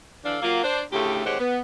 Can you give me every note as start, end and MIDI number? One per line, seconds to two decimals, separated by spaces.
0.25 0.38 50
0.25 0.38 52
0.25 0.38 62
0.25 0.38 69
0.25 0.38 74
0.25 0.38 77
0.43 0.62 54
0.43 0.62 58
0.43 0.62 65
0.64 0.82 62
0.64 0.82 72
0.92 1.24 38
0.92 1.24 45
0.92 1.24 49
0.92 1.24 57
0.92 1.24 67
1.25 1.37 39
1.25 1.37 56
1.25 1.37 60
1.25 1.37 67
1.25 1.37 73
1.25 1.37 78
1.39 1.61 59